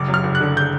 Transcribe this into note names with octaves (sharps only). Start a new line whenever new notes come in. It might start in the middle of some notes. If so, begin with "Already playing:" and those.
Already playing: F#1 D6
F#2
F6
F#1
F#6
D3
G6